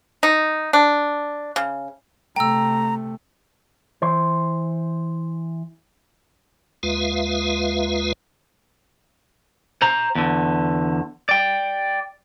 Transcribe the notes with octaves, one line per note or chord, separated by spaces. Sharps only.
D#4
D4
C#3
C3 A3 G5 A#5 E6
E3 C5
D#2 G#3 F4 B4 E5 F5
C5 A#5
E2 D3
D5 G5